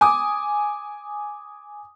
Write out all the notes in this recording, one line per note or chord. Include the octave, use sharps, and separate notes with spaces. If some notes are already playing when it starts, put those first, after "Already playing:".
G#5 D6 D#6